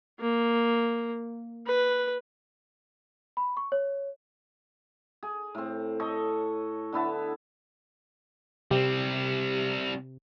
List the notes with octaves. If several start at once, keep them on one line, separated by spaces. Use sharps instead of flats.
A#3
B4
B5
C#6
C#5
G#4
A2 C4
A4 C#5 D#5
D3 B3 E4 A5
C3 G3 C4 G4